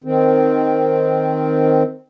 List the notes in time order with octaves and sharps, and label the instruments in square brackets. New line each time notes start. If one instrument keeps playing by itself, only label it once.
[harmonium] D#3 C4